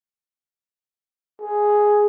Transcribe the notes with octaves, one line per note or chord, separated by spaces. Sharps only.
G#4